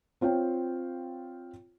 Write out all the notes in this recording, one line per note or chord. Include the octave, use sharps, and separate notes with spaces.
C4 F4 C#5 G5